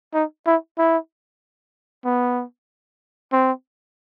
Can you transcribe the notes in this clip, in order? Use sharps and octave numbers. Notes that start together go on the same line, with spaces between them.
D#4
E4
E4
B3
C4